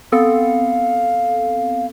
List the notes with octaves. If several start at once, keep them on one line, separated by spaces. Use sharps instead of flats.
B3 C4 A4 F5